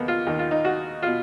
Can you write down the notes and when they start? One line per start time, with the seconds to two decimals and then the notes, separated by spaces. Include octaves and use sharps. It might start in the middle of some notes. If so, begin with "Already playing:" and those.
Already playing: D#2 A#3 B3
0.08 F4
0.27 D#2 D#3 D#4
0.39 F4
0.51 D#4
0.64 F#4
1.02 B2 F4